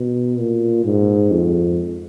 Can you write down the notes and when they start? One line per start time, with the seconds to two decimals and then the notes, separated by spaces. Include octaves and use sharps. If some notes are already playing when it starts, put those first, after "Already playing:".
Already playing: B2
0.39 A#2
0.84 G#2
1.31 F2